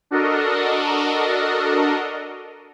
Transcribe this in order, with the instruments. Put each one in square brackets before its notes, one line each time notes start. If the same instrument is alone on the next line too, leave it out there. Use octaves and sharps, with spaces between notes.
[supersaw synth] D4 F#4 A4 A#4 D#5